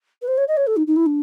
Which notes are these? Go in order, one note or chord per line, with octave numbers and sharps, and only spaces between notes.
B4
C5
C#5
D#5
C#5
A4
D#4
D#4
E4
D4